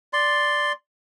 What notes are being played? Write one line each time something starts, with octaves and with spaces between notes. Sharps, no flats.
D5 C6